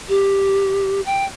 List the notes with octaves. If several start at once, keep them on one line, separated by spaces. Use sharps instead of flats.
G4
G5